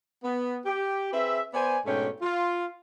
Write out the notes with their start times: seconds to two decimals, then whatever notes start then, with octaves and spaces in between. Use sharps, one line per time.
0.24 B3
0.66 G4
1.13 C4 G#4 B4 E5
1.54 B3 C5 D5 G#5
1.86 G#2 B2 A3 C#4 D4 G5
2.22 F4